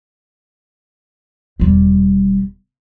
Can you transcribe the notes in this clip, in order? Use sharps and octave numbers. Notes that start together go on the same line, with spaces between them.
E1 G3